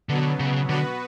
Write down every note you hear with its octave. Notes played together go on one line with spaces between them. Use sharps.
B2 D3 F#3 B3
C#3
D3 B3 F#4 B4